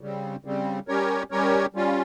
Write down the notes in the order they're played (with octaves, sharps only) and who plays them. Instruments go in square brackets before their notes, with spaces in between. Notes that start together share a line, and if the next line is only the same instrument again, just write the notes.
[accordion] C#3 G3 C4
C#3 G3 C4
G3 C#4 G4 A#4 C#5
G3 C#4 G4 A#4 C#5
G3 C#4 F4